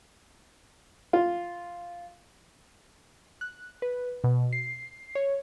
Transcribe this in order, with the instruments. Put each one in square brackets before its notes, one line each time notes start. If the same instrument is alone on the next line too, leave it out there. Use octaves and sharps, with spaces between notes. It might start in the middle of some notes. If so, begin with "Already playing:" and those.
[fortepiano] F4
[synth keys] F#6
B4
B2
C7
C#5